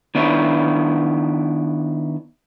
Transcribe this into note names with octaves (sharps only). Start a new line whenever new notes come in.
D#3 B3 D4 E4 C#5